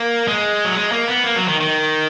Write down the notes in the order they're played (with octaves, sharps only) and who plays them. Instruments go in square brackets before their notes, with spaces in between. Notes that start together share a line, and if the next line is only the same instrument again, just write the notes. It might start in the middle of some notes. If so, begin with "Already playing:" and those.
Already playing: [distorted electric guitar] A#3
G#3
F#3
G#3
A#3
B3
A#3
F#3
D#3
D#3